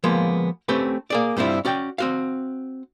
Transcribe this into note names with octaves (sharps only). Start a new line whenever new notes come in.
F3 G#3 A#3 B3
A3 C4 C#4 G4 B4
A#3 G#4 D5
G2 G3 C4 D4 E4 F4
C#4 F#4 D5 G5
C4 F#4 F5